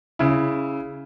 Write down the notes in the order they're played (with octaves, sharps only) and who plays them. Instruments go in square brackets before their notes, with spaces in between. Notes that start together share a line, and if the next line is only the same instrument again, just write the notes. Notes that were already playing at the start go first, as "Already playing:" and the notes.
[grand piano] C#3 E4